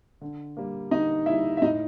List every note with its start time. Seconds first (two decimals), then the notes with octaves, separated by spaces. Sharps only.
0.21 D3
0.57 G3 A#3
0.91 D3 D#4 D#5
1.26 G3 A#3 E4 E5
1.57 E5
1.61 A2 D#4 D#5